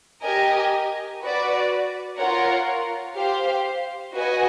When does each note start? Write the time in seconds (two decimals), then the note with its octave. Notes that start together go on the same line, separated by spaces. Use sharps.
0.23 G4 A#4 D#5 G#5
1.21 F#4 B4 D5
2.19 F4 A#4 C#5 F#5
3.15 G4 C5 F5
4.14 F#4 B4 D#5 G#5